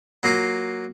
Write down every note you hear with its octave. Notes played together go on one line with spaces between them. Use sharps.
F#3 A#3 F4 F5 D6